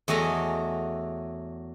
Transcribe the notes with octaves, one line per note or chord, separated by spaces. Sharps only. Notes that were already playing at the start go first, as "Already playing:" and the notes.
E2 F#3 A3 D#5 G#5 A#5